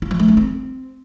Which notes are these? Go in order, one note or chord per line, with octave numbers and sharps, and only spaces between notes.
F4
F3
A3
D4
C4